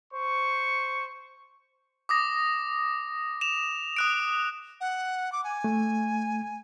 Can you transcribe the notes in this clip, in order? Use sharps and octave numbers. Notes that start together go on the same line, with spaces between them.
C5 C#6
D6 D#6 A#6
E7 F7
D#6 F#6 D7
F#5
D6
G#5
A3